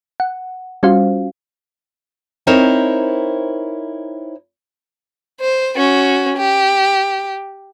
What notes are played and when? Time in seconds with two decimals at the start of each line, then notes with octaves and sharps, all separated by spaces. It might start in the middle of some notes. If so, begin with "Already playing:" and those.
0.20 F#5
0.83 G3 C#4 F4 F#4 C5 F5
2.47 C4 D#4 E4 A#4 C5 C#5
5.40 C5
5.76 C#4 F#4
6.37 G4